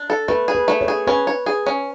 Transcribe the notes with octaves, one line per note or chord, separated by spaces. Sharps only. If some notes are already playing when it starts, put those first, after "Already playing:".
Already playing: D4
A4
A3 B4
G#4
B4
A3
C#5
G#4
C#4 B4
C#5
G#4
C#4